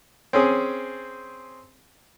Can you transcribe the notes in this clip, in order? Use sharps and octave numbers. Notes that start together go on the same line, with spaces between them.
C4 C#4 G#4